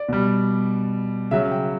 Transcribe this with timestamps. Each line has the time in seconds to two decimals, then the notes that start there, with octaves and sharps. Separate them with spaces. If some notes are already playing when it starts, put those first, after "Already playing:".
Already playing: D5
0.09 B2 G3
1.31 C#3 F#3 E5
1.51 G5